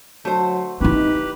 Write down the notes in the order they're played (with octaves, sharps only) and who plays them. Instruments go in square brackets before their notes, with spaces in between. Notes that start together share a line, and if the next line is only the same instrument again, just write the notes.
[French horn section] D3 F#3 [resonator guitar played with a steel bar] A3 C5
[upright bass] C4 E4 [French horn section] D#4 [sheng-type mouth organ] G4 B4